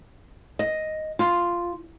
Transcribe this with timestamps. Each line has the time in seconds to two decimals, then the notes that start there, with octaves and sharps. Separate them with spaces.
0.59 D#5
1.19 F4